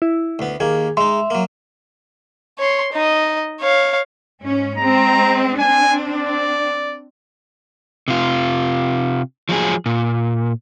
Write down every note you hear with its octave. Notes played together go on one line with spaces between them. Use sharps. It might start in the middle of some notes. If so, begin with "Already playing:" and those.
E4
D2 B3
D#2 A#3 G#4
G#3 D#4 E5 C6
F#3 A#3
C#5 C6
D#4 D#5
C#5 F5
G#2 C#4
G#3 C4 A#5
C4 D4 G#5
D5
C3 F4
F3 F#3 G#3 G#4
A#2